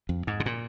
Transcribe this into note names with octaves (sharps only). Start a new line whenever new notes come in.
F2
G#2
C3
A#2